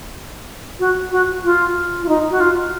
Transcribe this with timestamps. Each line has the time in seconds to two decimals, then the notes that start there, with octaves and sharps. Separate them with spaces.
0.79 F#4
1.11 F#4
1.43 F4
2.02 F4
2.08 D#4
2.30 F#4
2.40 F4